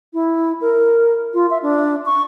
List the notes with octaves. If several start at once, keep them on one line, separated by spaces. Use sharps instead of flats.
E4
A#4
F4
E5
D4
C#6